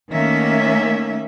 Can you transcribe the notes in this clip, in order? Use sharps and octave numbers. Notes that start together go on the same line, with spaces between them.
D#3 A3 A#3 C#4 E5